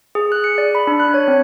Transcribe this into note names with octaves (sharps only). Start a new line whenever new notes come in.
G#4
F#6
C#7
D5
B5
D4
F#6
C#5
C4